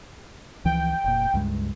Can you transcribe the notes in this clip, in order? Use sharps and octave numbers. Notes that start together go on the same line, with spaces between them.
C#2 E3 F3 G5
F1 A#2
C#2 G2 G#3